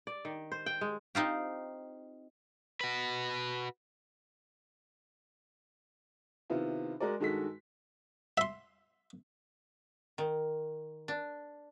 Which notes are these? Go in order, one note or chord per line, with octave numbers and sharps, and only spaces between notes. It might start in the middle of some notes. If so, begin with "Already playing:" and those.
D5
D#3
C5
G5
G#3
C4 D#4 F4 G4
F#4 B4
C3 D#3 B3 E4 F4
G#3 F#4 A#4 D5
G2 D#3 G#3 F#4 A4 B6
E5 C6
D#3
D4